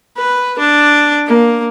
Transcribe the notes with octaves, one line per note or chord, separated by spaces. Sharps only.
B4
D4
A#3